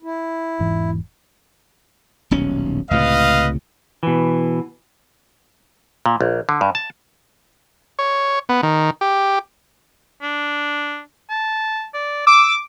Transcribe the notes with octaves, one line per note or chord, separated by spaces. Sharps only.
E4
E1 G#2 E3
D#1 B1 C#4
C#2 A2 C3 B4 D#5 F5
B2 E3
A#2
A#1
D3
G2
A5
C#5
B3
D#3
G4
D4
A5
D5
D6 E6